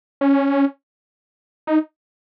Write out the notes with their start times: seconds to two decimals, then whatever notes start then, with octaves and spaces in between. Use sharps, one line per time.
0.21 C#4
1.67 D#4